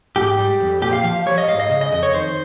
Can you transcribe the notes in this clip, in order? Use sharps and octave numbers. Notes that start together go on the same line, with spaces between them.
G#2 G4
G3
F2
A#2 G4
F5
F3 F5
G3 C#5
D#5
G#2 F5
D#5
C#3
D#5
F2 D#5
C#5
D#3 C5